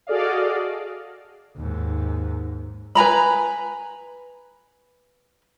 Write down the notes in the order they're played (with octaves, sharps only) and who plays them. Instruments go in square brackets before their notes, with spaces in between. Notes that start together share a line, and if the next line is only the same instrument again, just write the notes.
[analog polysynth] F#4 G#4 A4 D5 D#5 F5
[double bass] D#2 G#2
[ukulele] B4 G#5 A#5 B5